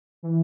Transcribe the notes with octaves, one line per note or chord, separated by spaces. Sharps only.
E3